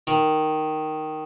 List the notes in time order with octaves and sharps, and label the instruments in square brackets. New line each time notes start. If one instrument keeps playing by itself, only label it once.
[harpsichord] D#3